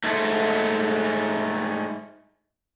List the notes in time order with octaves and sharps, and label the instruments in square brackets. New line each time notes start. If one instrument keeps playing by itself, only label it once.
[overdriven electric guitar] G#2 A3